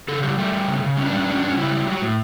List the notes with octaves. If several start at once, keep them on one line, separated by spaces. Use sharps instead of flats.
C#3 A4
G3 G4
G3 A3
G3
C#3
C#3
G3 C#4
D4
G3 C#4
D4
G3 C#4
D4
G3 C#4
C#3 E4
G3
F#3
A2